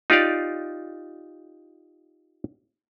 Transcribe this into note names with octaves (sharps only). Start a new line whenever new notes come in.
D#4 F4 G4 D5 F5